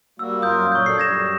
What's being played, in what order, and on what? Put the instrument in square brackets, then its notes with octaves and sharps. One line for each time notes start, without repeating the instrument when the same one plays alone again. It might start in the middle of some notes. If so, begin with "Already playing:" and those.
[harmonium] G3 A#3 F#4 [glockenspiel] E6
[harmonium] F#2 F4 A#4 [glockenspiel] D#6 G6
[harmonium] A#2 F#3 [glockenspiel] C#6 G6
[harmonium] D4 A4 D5 [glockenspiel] C7
[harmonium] F#2 G3 [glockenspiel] G#6 A#6 E7